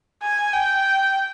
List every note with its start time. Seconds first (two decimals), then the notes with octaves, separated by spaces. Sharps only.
0.23 G#5
0.53 G5